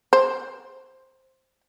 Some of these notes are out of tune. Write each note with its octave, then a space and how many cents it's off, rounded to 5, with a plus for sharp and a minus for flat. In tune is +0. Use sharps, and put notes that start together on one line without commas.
C5 +5